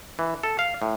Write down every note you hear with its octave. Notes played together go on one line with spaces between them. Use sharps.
E3
A4
F5
A2